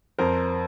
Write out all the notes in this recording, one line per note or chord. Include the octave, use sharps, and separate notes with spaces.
F2 A#4 C5